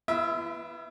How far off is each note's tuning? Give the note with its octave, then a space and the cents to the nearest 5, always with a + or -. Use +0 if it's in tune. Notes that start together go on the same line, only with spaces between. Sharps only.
B3 +0 E4 +45 E5 -20